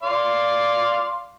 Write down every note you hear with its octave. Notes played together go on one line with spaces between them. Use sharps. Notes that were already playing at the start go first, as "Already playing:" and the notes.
D5 F5 C6